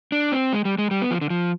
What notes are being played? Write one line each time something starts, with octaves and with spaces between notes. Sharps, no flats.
D4
C4
G#3
G3
G#3
G3
B3
F3
D3
F3